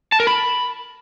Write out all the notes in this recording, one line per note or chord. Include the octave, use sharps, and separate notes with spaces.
A5
A#4
B5